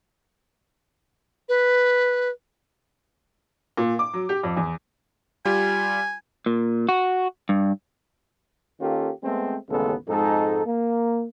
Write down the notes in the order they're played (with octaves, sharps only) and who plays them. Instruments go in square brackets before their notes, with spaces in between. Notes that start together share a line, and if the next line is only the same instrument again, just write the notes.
[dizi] B4
[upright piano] A#2
D6
F#3
G4
F2
E2
[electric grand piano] G3 F4 G4 [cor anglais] G#5
[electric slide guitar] A#2
F#4
G2
[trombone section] D#3 A#3 C#4 F4 G4 A4
G#3 A3 B3 C4
A1 D#2 C#3 G#3 B3 A4
F2 G#2 G#3 D#4 A4
A#3